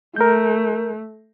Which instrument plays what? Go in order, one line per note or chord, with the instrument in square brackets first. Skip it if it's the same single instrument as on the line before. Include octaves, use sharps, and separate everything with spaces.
[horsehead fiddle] A3 [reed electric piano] A#4 G6